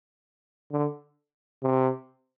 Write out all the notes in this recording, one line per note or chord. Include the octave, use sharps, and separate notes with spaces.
D3
C3